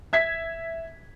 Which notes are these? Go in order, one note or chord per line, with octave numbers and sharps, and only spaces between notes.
E5 G#6 B6